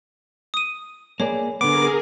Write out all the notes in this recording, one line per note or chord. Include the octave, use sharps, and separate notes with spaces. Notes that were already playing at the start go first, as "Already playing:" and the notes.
D#6 D#7
A#3 G#4 C#5 D5
D3 B3 G#4 A#4 D6